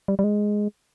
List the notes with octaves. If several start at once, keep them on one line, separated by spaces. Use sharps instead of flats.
G3
G3
G#3